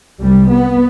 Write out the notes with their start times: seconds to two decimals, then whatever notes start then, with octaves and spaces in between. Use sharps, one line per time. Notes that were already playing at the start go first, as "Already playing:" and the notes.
0.20 C2 C3 G3
0.50 B3